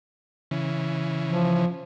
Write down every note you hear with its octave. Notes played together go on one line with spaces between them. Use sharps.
C#3 E3
F3